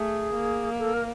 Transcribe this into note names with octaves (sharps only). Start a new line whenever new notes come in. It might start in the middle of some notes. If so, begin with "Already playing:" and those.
Already playing: A3 G#4
A#3
A4
A#4